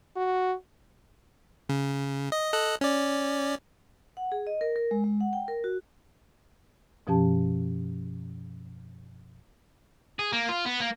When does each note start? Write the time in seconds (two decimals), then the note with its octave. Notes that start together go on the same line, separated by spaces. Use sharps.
0.16 F#4
1.69 C#3
2.32 D#5
2.53 A4 D#5 F#6
2.81 C#4 D5
4.17 F#5
4.32 G#4
4.47 D#5
4.61 A#4
4.76 A#4
4.91 G#3
5.04 G#3
5.21 F#5
5.33 G5
5.48 A#4
5.64 F#4
7.07 F#2 B2 F3 C#4 G4 A5
10.19 G#4
10.32 A#3
10.49 F4
10.66 B3
10.80 A#3